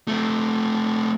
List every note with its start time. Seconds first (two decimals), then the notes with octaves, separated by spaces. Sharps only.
0.08 A3 C4